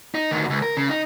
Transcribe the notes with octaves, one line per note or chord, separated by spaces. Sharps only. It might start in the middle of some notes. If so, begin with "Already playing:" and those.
D#4
D2 D#3
C#2
A#4
C#3
D#4